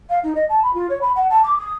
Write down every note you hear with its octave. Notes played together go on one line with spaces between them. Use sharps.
F5
D#4
D#5
A5
B5
F4
C#5
B5
F#5
A5
D6
D#6